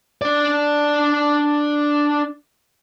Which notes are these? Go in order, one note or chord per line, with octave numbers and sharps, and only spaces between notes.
D4 D5